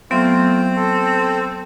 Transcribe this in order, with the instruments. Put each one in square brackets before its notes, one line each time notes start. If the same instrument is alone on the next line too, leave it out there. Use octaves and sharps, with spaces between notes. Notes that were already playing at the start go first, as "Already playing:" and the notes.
[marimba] F#3 B3 [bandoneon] A3 F4 [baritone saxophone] C4
[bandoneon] A4